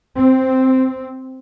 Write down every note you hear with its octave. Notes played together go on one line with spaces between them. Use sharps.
C4